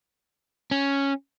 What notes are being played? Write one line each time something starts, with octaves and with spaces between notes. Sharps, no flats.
C#4